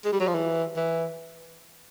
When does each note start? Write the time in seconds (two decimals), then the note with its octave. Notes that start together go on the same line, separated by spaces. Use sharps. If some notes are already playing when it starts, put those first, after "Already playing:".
0.05 G#3
0.12 G3
0.20 F#3
0.28 F3
0.35 E3
0.76 E3